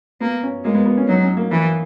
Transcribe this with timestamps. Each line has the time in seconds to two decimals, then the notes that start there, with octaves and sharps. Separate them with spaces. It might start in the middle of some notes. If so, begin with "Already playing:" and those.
0.21 A#3 B3
0.43 C#4
0.64 G#3 A#3
0.75 B3
0.86 B3
0.97 C#4
1.08 F#3 D#4
1.23 C#4
1.37 A#3
1.51 E3 A#3